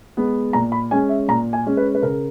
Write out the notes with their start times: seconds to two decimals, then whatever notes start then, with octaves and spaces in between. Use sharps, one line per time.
0.17 G#3 B3
0.53 A#2 A#5
0.72 B5
0.91 G#3 C#4 G#5
1.09 E5
1.28 A#2 A#5
1.53 G#5
1.66 G#3 C#4
1.77 B4
1.95 B4
2.02 C#3 A#4